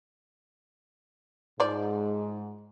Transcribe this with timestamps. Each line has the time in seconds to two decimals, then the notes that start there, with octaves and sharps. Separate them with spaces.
1.60 G#2 F3 D5